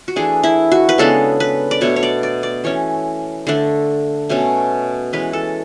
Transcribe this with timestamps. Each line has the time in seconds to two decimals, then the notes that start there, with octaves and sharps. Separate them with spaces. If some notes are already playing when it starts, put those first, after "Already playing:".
0.08 F#4
0.16 E3 A3 D4 G#4
0.44 E4
0.72 F#4
0.89 B4
0.98 C#3 G#3 B3 D4 A4
1.40 B4
1.71 D5
1.81 B2 A3 D4 C#5
1.96 C#5
2.03 D5
2.23 D5
2.43 D5
2.64 E3 A3 C#4 C#5
3.47 D3 A3 D4
4.29 B2 A3 C#4
5.13 E3 G#3 C#4 B4
5.33 A4